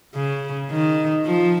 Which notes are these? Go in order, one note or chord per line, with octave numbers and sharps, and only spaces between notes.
C#3
D#3
F3